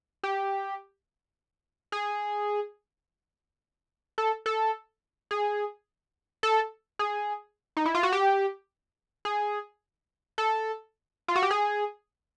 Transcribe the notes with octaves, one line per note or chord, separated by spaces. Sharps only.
G4
G#4
A4
A4
G#4
A4
G#4
D#4
E4
F4
F#4
G4
G#4
A4
F4
F#4
G4
G#4